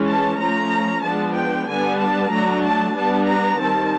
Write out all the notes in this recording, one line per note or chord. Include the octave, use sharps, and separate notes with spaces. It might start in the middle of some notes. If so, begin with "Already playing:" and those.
Already playing: E3 G#3 C#4
A5
F3 A3 C#4 A#5
F3 G#3 B3 D4 A5
G5
D3 G3 B3 D4 G#5
A5
F#3 A3 D4 A#5
A5
G3 B3 D4 A5
A#5
D#3 G3 C4 A5